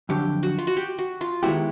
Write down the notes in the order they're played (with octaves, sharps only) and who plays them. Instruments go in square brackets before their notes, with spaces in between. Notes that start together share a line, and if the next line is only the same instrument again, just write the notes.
[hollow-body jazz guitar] F2 D3 F#3 [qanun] G4
[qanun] F#4
F4
F#4
G4
F#4
F4
[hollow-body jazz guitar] D#3 G#3 B3 E4 G4 [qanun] F#4